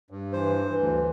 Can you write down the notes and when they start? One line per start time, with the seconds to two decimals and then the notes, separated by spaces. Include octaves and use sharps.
0.10 G2
0.33 E3 C5
0.57 E3
0.79 D2